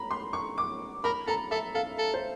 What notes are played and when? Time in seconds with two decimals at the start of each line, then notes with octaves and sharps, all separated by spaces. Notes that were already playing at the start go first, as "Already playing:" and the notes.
Already playing: A#5 B5
0.11 C6
0.33 C#6
0.58 D6
1.04 A#4 B5
1.27 A4 A#5
1.51 A4 E5
1.74 A4 F5
1.98 A4
2.14 C5